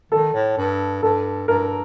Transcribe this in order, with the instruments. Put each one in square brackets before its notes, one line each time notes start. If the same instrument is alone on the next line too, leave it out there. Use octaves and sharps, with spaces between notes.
[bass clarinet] D#3 [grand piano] A4
[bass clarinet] A2
G2
[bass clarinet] G2 [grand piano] A4
[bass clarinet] G2 [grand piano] A#4